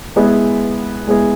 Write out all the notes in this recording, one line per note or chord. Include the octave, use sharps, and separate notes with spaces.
G#3 B3 E4 G#4 B4
G#3 B3 E4 G#4 B4